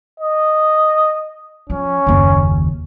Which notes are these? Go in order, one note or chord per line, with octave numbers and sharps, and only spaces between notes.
D#5
F3 C#4
F#1 D#2